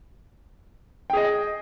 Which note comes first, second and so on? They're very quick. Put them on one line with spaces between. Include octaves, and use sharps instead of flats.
G5 G#4 D#5